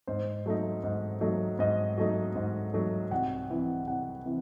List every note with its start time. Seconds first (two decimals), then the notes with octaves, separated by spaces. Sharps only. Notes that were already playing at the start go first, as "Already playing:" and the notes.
0.07 G#2 C5
0.46 F#3 A3 D#4
0.84 G#2
1.21 F#3 A3 D#4
1.59 G#2 D#5
1.98 F#3 A3 D#4
2.35 G#2
2.73 F#3 A3 D#4
3.11 C2 F#5
3.50 C3 E3
3.87 C2 F#5
4.25 C3 E3